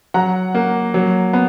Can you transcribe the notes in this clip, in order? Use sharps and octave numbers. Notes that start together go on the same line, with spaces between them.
F#3 F#5 A#5
A#3
F#3
B3